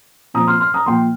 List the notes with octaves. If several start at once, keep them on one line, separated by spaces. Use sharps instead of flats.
A#2 F3 C4 A#5 D#6
C6 F6
C6 F6
A#5 D#6
A#2 F3 A#3 G5 C6